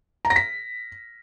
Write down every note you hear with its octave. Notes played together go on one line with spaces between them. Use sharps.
A#5
A#6
B6